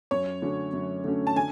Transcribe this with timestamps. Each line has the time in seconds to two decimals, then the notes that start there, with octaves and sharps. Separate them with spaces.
0.11 F#2 C#5
0.42 D3 A3 C#4 F#4
0.73 F#2
1.04 D3 A3 C#4 F#4
1.27 A5
1.36 D3 G#5